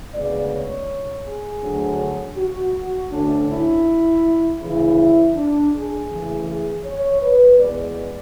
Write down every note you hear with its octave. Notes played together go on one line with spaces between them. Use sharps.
D2 C#3 G#3 B3 D5
C#5
G#4
D2 D3 F#3
F#4
D2 D3 A3 C#4 D4
E4
D2 C#3 E3 E4
D4
G#4
C#3 E3 A3
G#4
C#5
B4
E2 B2 G#3 B3 D5